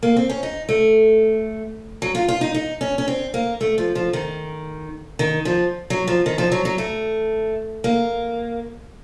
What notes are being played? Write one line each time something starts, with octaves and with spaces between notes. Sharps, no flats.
A#3
C4
C#4
D#4
A3
F#3
F4
F4
D#4
D#4
C#4
C#4
C4
A#3
A3
F3
F3
D#3
D#3
F3
F#3
F3
D#3
F3
F#3
F#3
A3
A#3